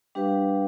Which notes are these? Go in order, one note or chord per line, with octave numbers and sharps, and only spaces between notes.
G3 D4 G4 B4 F5